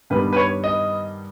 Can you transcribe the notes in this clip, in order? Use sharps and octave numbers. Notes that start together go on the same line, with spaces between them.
G2 D#3 G3 B3 B4
B4
C#5
D#5